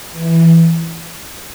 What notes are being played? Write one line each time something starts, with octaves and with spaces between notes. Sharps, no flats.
E3